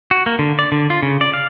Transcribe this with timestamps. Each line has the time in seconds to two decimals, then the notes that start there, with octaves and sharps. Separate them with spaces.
0.11 F#4
0.26 A#3
0.39 D3
0.59 D5
0.72 D3
0.90 F4
1.03 C#3
1.21 D5
1.34 F5